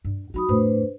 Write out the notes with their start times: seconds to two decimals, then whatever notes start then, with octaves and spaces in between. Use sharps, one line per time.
0.05 G2
0.34 F#3 D#4 F#4 B5 D#6
0.49 F2 A2 D4 B4 C5